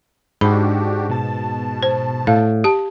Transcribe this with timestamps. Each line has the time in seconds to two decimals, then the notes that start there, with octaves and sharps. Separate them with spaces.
0.41 G#2 D4 F#4 G4 B5
1.09 B2 A5
1.83 C5
2.27 A2 F5
2.64 G4 A5